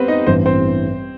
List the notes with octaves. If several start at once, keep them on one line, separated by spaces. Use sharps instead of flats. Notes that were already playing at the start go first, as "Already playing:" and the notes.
Already playing: G3 B3 C4 B4 C5
D#4 D#5
A1 G2 E3 B3 C4 C5
C4 C5